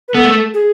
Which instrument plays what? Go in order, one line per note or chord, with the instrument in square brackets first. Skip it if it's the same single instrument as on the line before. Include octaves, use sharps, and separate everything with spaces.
[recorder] B4
[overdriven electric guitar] B3 [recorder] A4
[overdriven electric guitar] A3
[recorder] G#4